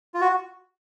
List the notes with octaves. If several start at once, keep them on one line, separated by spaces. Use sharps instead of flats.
F4
F#4